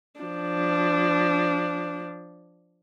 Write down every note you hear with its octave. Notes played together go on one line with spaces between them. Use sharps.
F3 D4